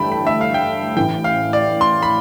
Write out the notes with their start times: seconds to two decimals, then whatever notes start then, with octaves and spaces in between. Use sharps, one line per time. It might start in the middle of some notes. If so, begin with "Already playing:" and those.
Already playing: G1 G2 E3 A3 G5 A5 B5
0.12 B5
0.27 E5
0.41 F5
0.54 G5
0.96 A1 A2 E3 G5
1.24 F5
1.53 D5
1.81 C6
2.03 B5